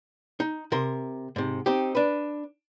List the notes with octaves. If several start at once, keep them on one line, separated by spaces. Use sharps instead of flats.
D#4
C3 A#4 C6
G#2 C3
C4 D#4 G4
D4 B4